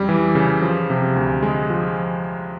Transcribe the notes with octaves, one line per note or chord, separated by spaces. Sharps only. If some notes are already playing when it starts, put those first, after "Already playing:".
Already playing: F2 C#3 G3
E3
C#3
F3
C3
D2
G#3
F3